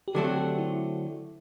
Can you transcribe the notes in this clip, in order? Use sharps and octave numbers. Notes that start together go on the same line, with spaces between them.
G4
D3 F#3 A3 C4 A4
G4
E4